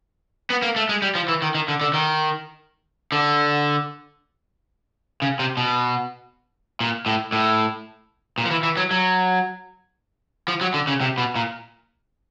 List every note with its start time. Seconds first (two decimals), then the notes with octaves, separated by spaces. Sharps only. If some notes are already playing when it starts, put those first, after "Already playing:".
0.50 B3
0.62 A#3
0.76 A3
0.89 G#3
1.02 G3
1.15 F3
1.28 E3
1.42 D#3
1.55 D#3
1.68 D3
1.81 D3
1.93 D#3
3.12 D3
5.22 C#3
5.39 C3
5.57 B2
6.80 A#2
7.06 A2
7.32 A2
8.38 A#2
8.45 F3
8.51 E3
8.63 E3
8.77 F#3
8.91 F#3
10.48 F3
10.61 F#3
10.74 D3
10.87 C#3
11.01 C3
11.18 B2
11.36 A#2